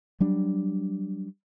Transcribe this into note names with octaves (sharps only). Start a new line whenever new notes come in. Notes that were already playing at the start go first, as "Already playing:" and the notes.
F#3 G3 D4